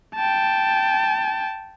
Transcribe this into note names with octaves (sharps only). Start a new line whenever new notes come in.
G5 A5